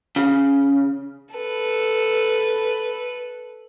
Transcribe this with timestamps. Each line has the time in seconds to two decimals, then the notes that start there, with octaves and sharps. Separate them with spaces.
0.16 C#3
1.35 A4 B4